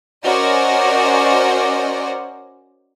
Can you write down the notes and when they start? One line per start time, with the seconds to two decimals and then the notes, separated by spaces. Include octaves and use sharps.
0.24 C#4 F#4 A#4 C5 D5 D#5